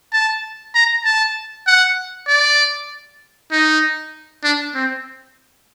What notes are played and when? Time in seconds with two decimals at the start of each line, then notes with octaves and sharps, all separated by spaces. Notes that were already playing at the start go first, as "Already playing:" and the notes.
0.13 A5
0.75 A#5
1.05 A5
1.67 F#5
2.28 D5
3.52 D#4
4.44 D4
4.74 C4